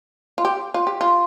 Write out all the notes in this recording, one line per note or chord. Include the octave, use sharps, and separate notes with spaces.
F4
G4
F4
G4
F4